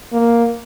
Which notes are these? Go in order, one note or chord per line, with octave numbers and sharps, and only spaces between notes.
A#3